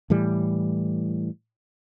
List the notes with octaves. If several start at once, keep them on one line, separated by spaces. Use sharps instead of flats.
A2 E3 G3